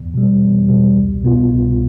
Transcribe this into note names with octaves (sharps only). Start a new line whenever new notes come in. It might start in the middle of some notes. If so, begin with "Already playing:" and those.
Already playing: E2
B2 G3
E2
B2 G3
C2
B2 B3 F4
C2